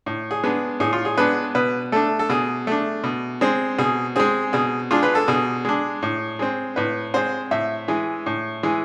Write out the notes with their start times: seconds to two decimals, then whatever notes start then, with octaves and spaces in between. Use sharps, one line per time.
0.06 A2
0.31 G#4
0.44 G#3 B3 D4
0.80 A2 G#4
0.93 F4
1.05 G#4
1.17 G#3 B3 D4 B4
1.55 B2 B4
1.92 A3 D4 A4
2.19 A4
2.29 B2 G#4
2.67 A3 D4
3.04 B2
3.41 G#3 C4
3.78 B2 G#4
4.16 G#3 C4 G#4
4.53 B2 G#4
4.91 G#3 D4 F4
5.03 B4
5.15 A4
5.28 B2 G#4
5.65 G#3 D4
6.03 A2
6.39 G#3 C4
6.76 A2 B4
7.14 G#3 C4 C5
7.51 A2 E5
7.88 E3 G#3
8.26 A2
8.63 E3 G#3